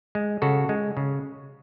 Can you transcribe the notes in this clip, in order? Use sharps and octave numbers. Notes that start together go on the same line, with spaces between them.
G#3
C#3 F#4 A4
G#3
C#3